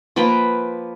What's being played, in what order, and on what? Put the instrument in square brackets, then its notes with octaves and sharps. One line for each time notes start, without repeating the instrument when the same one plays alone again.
[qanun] F3 A#3 B4 G5